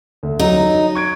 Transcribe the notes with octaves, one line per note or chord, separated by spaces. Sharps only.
D2
F#3 D#4
C#6 G#6 D7